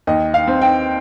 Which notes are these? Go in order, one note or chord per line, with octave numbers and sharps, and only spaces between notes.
D#2 D#5
F5
C4
G5